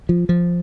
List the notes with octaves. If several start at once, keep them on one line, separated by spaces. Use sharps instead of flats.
F3
F3